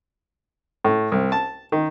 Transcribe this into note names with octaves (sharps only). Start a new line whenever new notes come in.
A2
C2
A5
D#3